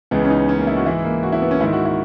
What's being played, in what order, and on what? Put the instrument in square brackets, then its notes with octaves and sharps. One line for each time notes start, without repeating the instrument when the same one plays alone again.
[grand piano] C#2 C#3 E3 B3
C#4
D#4
C#4
A#3
E4
F#4
G#2 E3 E4
A#3
F#4
E4
B3
C#4
G#2 D#3 E4
F#4
E4